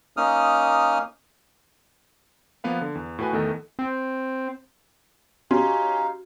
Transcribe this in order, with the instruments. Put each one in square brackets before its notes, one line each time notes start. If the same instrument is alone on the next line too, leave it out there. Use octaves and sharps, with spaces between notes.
[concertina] A#3 C#4 D#4 D#6 F6
[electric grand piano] F3 A#3 B3 B4 F5
D3
E2
A2 F#4 B4 G#5
E2 D#3 A3 A4 D#5
[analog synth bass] C4
[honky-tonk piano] C#4 [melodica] D#4 F5 [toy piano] F#4 [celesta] G4 C6